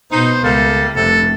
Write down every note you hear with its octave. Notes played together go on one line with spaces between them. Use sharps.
B2 B3 D#4 C5
C#2 G3 A3 A#3 A4
F1 G2 C3 A4